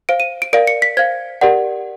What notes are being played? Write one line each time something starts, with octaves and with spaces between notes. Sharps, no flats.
C5 F5 D7
D#7
D7
A#4 D5 F5 D7
C#7
B6
C5 F5 G#6
G4 A#4 D5 F#5